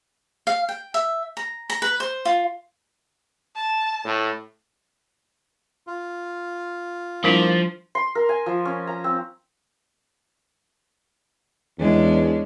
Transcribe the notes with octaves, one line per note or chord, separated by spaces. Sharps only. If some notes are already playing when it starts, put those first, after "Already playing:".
F5
G5
E5
A#5
A#5
B4
C5
F4
A5
A2
F4
F3 G3 A#3 D4 E4
C6
A#4
G#5
F3
C#4
A#5
C4
E2 G#3 C#4 D4